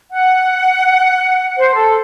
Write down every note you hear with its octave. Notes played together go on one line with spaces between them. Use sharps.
F#5
C5
A4